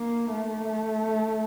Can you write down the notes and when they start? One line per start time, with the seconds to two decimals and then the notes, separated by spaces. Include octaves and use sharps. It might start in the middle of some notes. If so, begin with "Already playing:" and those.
Already playing: A#3
0.32 A3